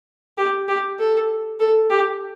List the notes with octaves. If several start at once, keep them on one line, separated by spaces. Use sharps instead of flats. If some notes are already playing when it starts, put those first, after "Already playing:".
G4
G4
A4
A4
G4